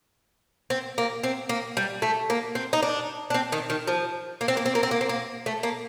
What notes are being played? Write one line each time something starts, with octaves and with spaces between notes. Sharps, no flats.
C4
A#3
C4
A#3
G3
A3
A#3
C4
D#4
D4
D4
C4
D#3
D#3
F3
A#3
C4
A#3
C4
A#3
C4
A#3
C4
A#3
A3
A#3